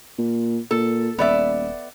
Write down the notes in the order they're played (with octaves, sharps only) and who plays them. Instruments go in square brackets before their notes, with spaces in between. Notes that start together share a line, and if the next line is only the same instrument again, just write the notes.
[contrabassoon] A#2
[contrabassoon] A#2 [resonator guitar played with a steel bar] A4
[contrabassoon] D#1 [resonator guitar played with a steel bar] B3 D5 E5